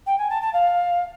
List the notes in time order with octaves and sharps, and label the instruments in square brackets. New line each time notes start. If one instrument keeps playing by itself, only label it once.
[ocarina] G5
G#5
A5
A5
F5